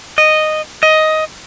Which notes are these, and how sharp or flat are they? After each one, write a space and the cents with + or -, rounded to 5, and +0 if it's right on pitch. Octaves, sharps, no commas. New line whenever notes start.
D#5 -10
D#5 +10